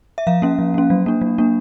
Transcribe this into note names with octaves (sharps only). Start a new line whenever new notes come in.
E5
F3 F5
A#3 C#4
F3
A#3 C#4
F#3
A#3 D4
F#3
A#3 D4